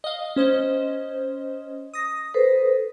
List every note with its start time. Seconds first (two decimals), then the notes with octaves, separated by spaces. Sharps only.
0.04 D#5 F5
0.36 C#4 C5 D#5
1.94 D#6 A#6
2.34 A4 B4 C5